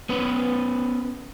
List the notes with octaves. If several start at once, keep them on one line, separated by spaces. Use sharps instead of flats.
B3 C#4 B4